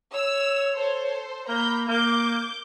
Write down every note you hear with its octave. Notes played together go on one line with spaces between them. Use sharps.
C#5 E6
A4 C5
A#3 A#5 B5 G6
A#3 D6 G6